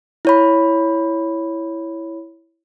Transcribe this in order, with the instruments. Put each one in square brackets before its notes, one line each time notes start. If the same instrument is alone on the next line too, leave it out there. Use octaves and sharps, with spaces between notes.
[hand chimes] E4 C#5 B5